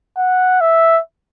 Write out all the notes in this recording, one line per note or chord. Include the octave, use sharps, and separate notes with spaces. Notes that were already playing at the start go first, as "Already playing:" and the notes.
F#5
E5